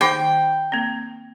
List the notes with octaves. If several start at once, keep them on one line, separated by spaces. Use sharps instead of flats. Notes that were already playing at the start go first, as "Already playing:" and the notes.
D#3 D#4 G5 D6
A#3 C4